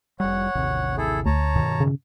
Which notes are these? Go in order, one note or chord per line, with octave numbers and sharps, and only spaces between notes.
F1 G3 C#5 F#5
A1 D#2 C3
E4 G#4 A4
D2 C#5 A5 A#5
G2 B2 D#3
C#3